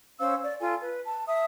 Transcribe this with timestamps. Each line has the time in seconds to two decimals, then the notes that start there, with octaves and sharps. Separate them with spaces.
0.18 C#4 C5 F5 E6
0.42 D5
0.60 F4 A4 G#5
0.81 B4
1.06 A5
1.27 E5 D#6